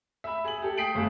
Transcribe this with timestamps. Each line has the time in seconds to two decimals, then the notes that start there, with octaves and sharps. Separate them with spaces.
0.24 E5 B5
0.45 G#4 E5 F#7
0.62 G4 A4
0.77 G5 D#6 B6 C7 D7 F#7
0.95 G1 A3 G#4 A5